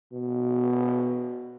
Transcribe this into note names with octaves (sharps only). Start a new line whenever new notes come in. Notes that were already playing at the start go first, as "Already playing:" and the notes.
B2